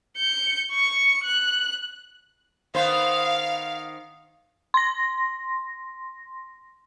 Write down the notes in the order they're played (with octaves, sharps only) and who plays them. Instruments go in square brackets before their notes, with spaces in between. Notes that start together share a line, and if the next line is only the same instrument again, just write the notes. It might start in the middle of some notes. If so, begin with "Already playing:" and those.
[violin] G6 C#7
C#6 C#7
F#6
[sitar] D#3 B3 C5 [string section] F5
[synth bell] C6 A#6